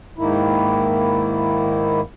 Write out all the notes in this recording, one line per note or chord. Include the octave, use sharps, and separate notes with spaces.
G#2 D#3 A#3 E4